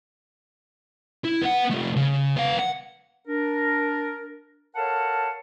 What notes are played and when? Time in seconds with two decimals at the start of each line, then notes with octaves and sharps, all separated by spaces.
1.25 E4
1.42 B3 F#5
1.71 F3 A3
1.96 C#3
2.36 B3 F5
2.59 F#5
3.28 D4 A#4
4.76 A4 A#4 C#5 F5 F#5 A5